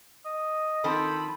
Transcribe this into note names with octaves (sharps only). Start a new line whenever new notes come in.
D#5
D#3 F3 C4 A4 B5